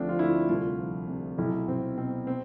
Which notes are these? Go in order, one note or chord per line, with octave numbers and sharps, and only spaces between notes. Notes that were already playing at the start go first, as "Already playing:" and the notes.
Already playing: D2 F3 C4 D4
F4
D2 E4
C2 F4
F3
C3
B1 E4
B1 C4
B2 C4
C4